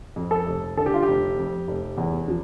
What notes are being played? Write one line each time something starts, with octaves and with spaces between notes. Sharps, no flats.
F2
A4
F1
D3 A4
G4
F4
F1 G4
F2
F1
E2
F3